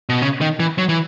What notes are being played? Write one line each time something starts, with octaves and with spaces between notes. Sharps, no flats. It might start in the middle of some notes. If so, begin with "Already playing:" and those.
B2
C#3
D#3
E3
F#3
E3